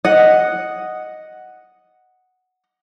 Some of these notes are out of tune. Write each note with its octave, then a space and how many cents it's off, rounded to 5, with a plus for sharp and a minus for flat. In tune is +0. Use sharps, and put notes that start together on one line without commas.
D#5 +0 F#5 +0